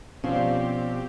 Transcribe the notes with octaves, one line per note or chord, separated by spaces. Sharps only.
B2 F3 C4 C#4 G4 C5 D5